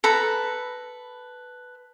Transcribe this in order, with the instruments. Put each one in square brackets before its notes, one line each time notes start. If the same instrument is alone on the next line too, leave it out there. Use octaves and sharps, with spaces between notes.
[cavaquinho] A4 B4 A#5 B5